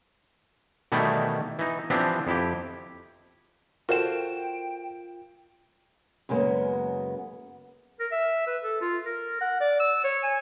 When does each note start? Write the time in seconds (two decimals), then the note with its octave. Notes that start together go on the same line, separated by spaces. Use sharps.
0.92 B2 D#3 E3 G3 A3 E4
1.59 E3 D#4
1.90 E3 F3 B3 C4 D4 G4
2.27 F2 E4 G4
3.89 F4 F#4 A4 A#4 C5 G5 E7
6.29 F#2 C#3 G#3 A#3 B3
7.99 A#4
8.12 E5
8.47 B4
8.63 A4
8.81 F4
9.06 A#4
9.41 F#5
9.60 D5
9.80 E6
10.04 C#5
10.23 G#5